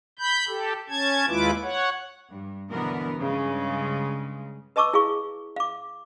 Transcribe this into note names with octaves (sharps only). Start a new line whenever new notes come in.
B5 G6
G4 A4
C#4 A5 G#6
D#2 G#3 E4 F4 B4 D6
C#5 F#5
G2
B2 D3 E3 B3 A#4
G2 C#3 G#3
B4 D#5 A5 C#6 D6 E6
E4 G#4 F5 C#6
F5 D6